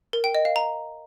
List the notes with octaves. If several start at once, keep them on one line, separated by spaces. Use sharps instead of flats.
A#4
G5
D#5
F5
A#5